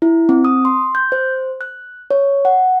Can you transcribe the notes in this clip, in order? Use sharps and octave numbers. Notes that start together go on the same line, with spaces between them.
E4
C4
D#6
C6
G6
C5
F#6
C#5
F#5